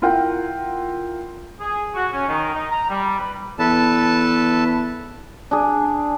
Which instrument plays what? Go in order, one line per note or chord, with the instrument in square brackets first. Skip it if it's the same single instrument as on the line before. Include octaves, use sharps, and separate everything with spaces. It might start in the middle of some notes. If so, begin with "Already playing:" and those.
[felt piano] E4 F4 A#4 F#5 G5
[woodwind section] G#4
F#4
C#4
D#3
D#4
A#5
G3
B4
[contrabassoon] E2 [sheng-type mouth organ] A4 B4 A5
[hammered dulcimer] D4 G#4